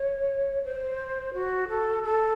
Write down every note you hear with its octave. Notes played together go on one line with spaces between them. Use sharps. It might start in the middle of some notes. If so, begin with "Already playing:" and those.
Already playing: C#5
C5
F#4
A4
A4